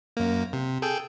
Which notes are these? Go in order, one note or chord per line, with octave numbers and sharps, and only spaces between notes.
F#2 A#3
C3
G#4 A4 G5